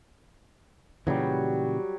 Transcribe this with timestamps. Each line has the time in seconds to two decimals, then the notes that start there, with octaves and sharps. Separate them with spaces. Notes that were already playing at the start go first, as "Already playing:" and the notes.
1.07 A#2 C#3 E3 F#3 G3